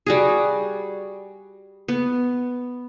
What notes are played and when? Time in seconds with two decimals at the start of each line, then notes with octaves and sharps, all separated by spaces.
0.07 G3 F#4 G#4
1.88 B3